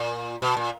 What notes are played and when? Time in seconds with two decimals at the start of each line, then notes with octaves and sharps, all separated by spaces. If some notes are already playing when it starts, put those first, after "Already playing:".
Already playing: A#2
0.42 B2
0.57 A#2